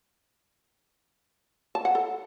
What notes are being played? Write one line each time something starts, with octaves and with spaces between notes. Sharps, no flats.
A5
F#5
A4